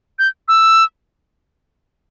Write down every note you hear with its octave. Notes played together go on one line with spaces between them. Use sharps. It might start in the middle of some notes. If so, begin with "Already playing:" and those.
G6
E6